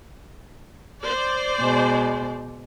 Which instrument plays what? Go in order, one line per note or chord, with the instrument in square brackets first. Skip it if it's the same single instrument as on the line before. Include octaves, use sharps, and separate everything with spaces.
[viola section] C5 D5
[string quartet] B2 G#3